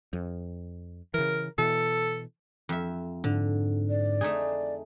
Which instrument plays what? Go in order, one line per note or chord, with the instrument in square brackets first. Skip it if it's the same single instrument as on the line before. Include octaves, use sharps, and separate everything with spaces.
[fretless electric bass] F2
[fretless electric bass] C#3 E3 [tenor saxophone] A#4
[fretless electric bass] B2 E3 [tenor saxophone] A4
[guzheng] F2 E5
[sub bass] G#2 [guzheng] D3
[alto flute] D5
[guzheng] A3 D#4 G#4